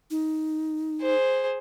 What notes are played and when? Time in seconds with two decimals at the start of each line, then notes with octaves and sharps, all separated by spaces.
0.11 D#4
1.02 G#4 C5